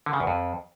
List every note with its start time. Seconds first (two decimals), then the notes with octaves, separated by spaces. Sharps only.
0.06 D3
0.13 C#3
0.20 E2
0.27 F2